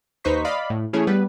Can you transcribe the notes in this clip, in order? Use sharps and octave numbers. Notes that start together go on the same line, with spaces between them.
D#2 D#4 B4 C5 C#6 B6
D5 D#5 F5 B5
A2
E3 A3 C#4 E4 G#4 C#5
G3 B3 B4